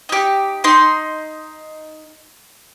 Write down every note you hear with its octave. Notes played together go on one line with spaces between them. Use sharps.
D#4 G4
D#4 C6